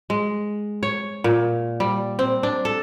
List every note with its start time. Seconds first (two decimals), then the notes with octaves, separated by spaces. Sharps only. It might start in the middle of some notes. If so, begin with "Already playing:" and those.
0.10 G#3
0.83 C#5
1.24 A#2
1.80 G3
2.19 C4
2.43 D4
2.65 A4